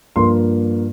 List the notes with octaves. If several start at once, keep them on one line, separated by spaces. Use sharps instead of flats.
G2 F3 A#3 C6